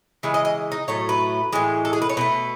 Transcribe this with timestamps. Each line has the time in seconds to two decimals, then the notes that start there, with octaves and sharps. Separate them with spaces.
0.23 C#3 E3 G#3 B4
0.34 D#5
0.45 D#5
0.72 D#4
0.88 A2 F#3 A3 C#5
1.09 B4
1.52 A2 E3 G#3
1.85 A4
1.93 G#4
2.02 B4
2.09 C#5
2.17 B2 A3 B4